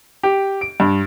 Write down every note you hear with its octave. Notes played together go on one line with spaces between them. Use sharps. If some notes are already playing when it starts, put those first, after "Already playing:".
G4
D7
G2